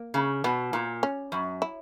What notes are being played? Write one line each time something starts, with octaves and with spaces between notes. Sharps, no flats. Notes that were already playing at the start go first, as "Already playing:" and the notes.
Already playing: A#3
C#3
B2 B3
A#2
C#4
F#2
E4